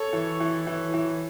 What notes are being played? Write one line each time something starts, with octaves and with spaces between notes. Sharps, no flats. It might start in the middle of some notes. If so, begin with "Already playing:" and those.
Already playing: A4 C#5
E3
E3
E3
E3